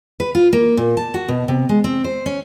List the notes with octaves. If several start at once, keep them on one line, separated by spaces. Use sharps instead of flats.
B4
F4
A#3
A#2
A5
F#4
B2
C3
G#3
C4
C5
C#4